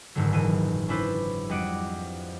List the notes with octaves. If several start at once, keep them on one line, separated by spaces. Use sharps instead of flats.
F#1 G#2 D3 D#3 F#3
D#1 E3 D#7
C#4 D4 E4 B4 C5
F2 G3 D#5 F#5 D6 D7